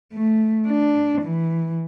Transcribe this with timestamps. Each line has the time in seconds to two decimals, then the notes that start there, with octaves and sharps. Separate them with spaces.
0.13 A3
0.68 D4
1.22 E3